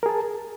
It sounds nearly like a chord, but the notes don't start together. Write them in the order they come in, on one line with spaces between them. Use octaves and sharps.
A#4 G#4 A5